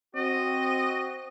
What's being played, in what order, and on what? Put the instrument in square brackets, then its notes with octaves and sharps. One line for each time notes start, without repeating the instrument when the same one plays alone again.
[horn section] C4 F#4 [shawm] D#5